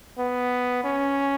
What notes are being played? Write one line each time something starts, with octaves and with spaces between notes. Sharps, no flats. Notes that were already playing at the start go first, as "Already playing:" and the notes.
B3
C#4